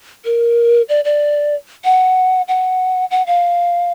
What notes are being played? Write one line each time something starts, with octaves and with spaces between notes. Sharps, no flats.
A#4
D5
D5
F#5
F#5
F#5
F5